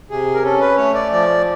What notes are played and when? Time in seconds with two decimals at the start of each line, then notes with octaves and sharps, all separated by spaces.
0.10 C3 G#4
0.34 A#4
0.44 C#4 A4
0.61 B4
0.77 A3 C#5
0.94 D5
1.11 F3 D5